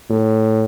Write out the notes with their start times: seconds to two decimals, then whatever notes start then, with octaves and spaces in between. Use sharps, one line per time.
0.11 A2